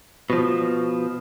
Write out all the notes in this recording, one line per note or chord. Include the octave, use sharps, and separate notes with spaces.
B2 F3